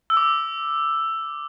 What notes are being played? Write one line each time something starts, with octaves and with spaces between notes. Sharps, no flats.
E6
D6